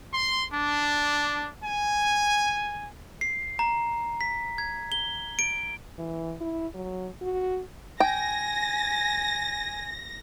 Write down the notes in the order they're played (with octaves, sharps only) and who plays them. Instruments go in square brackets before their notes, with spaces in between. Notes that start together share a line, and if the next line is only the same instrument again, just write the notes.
[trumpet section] C6
D4
G#5
[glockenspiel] C7
A#5
B6
G#6
G7
D7
[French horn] E3
E4
F#3
F#4
[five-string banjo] G5 [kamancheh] G#5 [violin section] A#6